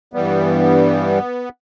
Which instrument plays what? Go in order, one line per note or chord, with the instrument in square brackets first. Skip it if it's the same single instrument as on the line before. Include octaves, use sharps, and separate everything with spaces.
[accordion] G2 E3 G3 B3